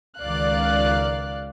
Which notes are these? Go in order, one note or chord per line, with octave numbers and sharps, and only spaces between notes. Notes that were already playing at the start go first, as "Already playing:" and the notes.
C#2 D#3 D5 F5 F#6